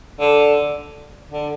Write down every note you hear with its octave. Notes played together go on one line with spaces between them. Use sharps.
D3
D3